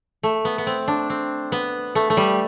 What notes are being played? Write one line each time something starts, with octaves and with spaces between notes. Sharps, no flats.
A3
B3
B3
C4
D4
C4
B3
A3
A3
G3